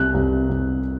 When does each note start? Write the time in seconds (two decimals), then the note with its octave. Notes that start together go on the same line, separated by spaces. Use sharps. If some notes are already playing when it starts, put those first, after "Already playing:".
Already playing: C2 F#6
0.14 C2
0.49 C2